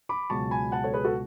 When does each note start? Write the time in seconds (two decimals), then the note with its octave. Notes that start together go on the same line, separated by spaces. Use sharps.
0.09 B5 D6
0.30 C#2 B2 F#3 A5 C#6
0.51 G#5 B5
0.72 F#5 A5
0.83 A4 C#5
0.93 G#4 B4
1.04 F#4 A4